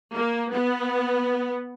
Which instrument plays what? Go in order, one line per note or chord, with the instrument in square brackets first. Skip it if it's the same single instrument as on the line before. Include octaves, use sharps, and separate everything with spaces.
[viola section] A#3
B3